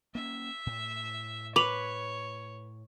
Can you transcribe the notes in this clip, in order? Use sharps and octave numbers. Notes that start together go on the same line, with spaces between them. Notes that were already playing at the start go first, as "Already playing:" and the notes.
A#3 C4 C#4 E5
A2
B4 C#5 D6 F7 F#7